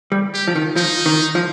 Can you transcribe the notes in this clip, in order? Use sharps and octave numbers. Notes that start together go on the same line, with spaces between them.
G3
G4
F3
D#3
F3 D#4
D#3
F3